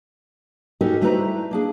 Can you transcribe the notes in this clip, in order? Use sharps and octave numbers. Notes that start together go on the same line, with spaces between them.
C#4 D#4 F#4 G4 A4 A#4
G3 A3 E4 B4 C5 A#5
A#3 D4 G#4